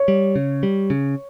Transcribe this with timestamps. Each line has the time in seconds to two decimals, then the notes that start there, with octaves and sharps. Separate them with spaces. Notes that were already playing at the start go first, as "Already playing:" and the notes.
Already playing: C#5
0.08 G3
0.36 C#3
0.63 G3
0.90 C#3